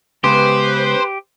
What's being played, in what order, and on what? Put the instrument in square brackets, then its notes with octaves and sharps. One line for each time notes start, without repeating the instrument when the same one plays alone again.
[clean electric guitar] C#3 G#3 B3 [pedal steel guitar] G4 [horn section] B4 [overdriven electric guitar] C5